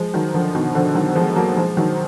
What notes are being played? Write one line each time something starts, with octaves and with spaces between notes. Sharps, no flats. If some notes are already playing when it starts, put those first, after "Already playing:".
Already playing: F3 G#3
D#3 F#3
D3 F3
B2 D#3
D3 F3
D#3 F#3
F3 G#3
F#3 A#3
F3 G#3
D#3 F#3